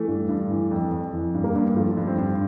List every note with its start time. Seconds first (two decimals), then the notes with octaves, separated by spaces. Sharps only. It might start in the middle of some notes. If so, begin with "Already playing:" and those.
Already playing: E3 A3
0.08 G2
0.29 G2
0.51 E3
0.71 F2
0.92 F2
1.13 E3
1.35 G2
1.44 A#3
1.56 G2
1.76 F3 A3
1.97 G2
2.07 C4
2.18 G2